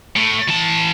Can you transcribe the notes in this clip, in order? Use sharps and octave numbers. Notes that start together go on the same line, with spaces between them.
A2
E3 A5